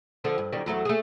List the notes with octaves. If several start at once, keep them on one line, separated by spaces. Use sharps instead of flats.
D3 F3 A4
G2
F#2 D#3 G3
E2 F#3 A3
A3 G#4